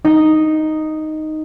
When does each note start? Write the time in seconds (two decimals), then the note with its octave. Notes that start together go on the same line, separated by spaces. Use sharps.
0.04 D#4